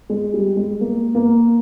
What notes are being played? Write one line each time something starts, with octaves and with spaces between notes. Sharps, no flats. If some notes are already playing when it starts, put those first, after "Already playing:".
G#3
G3
G#3
A#3
A#3